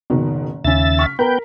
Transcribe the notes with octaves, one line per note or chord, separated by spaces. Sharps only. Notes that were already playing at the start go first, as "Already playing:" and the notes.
F#1 B2 D#3
D#2 C#3 C#4 E5 A6
C#6 F6 B6
B3 A#4 B4 G5 A#5